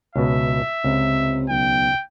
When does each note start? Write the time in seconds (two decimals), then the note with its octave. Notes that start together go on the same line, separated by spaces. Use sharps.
0.16 C#2 B2 E5
0.84 C#2 C3
1.49 B1 G5